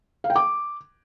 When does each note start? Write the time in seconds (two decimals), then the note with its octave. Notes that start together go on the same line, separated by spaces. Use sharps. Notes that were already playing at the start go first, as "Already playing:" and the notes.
0.24 F5
0.30 G5
0.36 D6